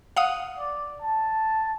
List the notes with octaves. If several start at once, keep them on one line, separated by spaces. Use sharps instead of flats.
F5 F#5 D#6
D5
A5